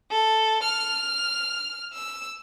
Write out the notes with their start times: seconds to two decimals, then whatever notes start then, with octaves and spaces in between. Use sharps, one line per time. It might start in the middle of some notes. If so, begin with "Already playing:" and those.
0.11 A4
0.63 F6
1.94 E6